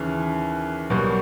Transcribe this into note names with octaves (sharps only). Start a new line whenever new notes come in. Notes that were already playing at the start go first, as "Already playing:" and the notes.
Already playing: D#2 C#3 E3
B1 B2 G3 A#3